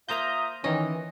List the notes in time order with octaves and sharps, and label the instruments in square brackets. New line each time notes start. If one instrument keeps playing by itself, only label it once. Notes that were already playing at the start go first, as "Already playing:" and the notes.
[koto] A#3 C5 D#5 [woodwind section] F4 E5 D#6 [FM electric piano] A#5 G6
[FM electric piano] D#3 C#4 [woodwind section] E3 [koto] D#5